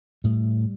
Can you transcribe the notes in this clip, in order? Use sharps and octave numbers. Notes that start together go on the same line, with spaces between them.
A2 G3